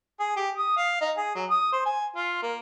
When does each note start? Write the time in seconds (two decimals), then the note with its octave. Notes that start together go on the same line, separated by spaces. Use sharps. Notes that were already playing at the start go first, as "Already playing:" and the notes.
0.20 G#4
0.36 G4
0.58 D#6
0.77 F5
1.01 D#4
1.17 G#4
1.35 F#3
1.50 D#6
1.72 C5
1.86 G#5
2.16 F4
2.42 A#3